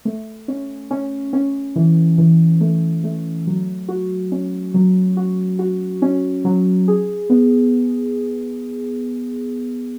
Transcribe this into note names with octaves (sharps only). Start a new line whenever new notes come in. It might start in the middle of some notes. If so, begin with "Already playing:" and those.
A3
C#4
C#4
C#4
E3
E3
A3
A3
F#3
F#4
C#4
F#3
F#4
F#4
C#4
F#3
G#4
B3